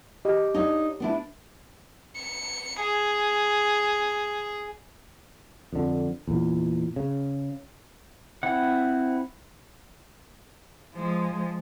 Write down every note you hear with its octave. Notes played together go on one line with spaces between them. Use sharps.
G4 D#5
D4 D#4 C#5 F5
B3 D4 E4
C#7
G#4
F2 D3
E2 A#2
C#3
C4 E4 F#5
F3 G#3